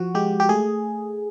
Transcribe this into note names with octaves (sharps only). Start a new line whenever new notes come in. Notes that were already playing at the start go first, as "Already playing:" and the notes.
Already playing: F3 F#4
G#3 G4
G4
A3 G#4